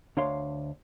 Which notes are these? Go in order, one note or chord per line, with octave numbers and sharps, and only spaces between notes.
D2 D4 C#5 F5 C6